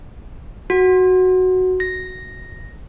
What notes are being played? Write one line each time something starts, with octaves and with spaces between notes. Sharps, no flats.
F#4
A#6